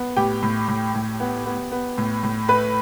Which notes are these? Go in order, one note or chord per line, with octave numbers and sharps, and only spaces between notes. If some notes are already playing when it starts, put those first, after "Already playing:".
Already playing: B3
A2 G4 G5
A2
A2
A2
B3
B3
B3
A2
A2
A3 B4 B5